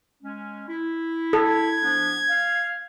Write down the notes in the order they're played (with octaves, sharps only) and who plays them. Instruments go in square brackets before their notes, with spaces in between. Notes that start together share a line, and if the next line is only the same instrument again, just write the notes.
[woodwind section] G#3 C#4
E4
[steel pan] A4 [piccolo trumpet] G#6
[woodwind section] F3 B3 D4
F5